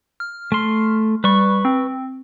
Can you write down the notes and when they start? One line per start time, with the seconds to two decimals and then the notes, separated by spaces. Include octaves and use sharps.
0.20 F6
0.52 A3 C6
1.24 G3 B4 C#6
1.65 C4